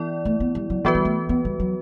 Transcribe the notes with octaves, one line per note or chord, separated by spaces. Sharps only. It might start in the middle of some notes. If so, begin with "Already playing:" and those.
Already playing: E3 B3 E4 D5
A3
B3
G3
F#3
E3 F#3 B3 F#4 B4
G3
A3
B3
G3
F#3